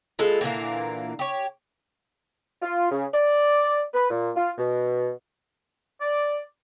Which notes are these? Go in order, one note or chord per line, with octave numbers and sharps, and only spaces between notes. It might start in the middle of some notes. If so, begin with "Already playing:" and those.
G#3 F4 A4 B4
A#2 D3 E3 A#3
G4 C#5
F4
C#3
D5
B4
A#2
F4
B2
D5